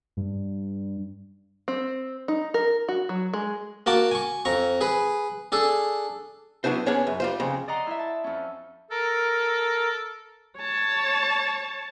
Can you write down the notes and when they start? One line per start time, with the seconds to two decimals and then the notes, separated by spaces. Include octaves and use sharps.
0.17 G2
1.68 C4
2.28 D#4
2.54 A#4
2.88 F#4
3.09 F#3
3.34 G#3
3.86 A#3 F#4 A5 D6
4.11 G#5 C#6
4.45 F2 A#5 C#6
4.81 G#4 B4
5.52 D4 G#4 A4
6.64 F#3 B3 D4 E4 C5
6.86 B3 C#4 D4 G#4 C#5
7.07 F#2
7.20 G3 F4 C5
7.40 F2 C#3
7.68 D5 D#5 F#5 A#5 C6
7.87 E4 E5
7.99 A5
8.24 F2 C#4
8.91 A4 A#4
10.58 C#5 A5